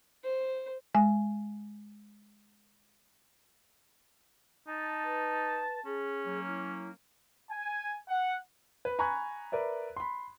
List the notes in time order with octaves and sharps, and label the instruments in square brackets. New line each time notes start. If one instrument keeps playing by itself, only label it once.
[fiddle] C5
[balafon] G#3 G#5
[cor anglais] D#4 [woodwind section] A5
[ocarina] B4
[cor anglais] C#4 [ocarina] G#4
[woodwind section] F#3 A#3
[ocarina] E4
[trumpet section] G#5
F#5
[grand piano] B4
G#5 A#5 B5 C#6 F#6 G#6
A#4 B4 D5 E5
B5 C6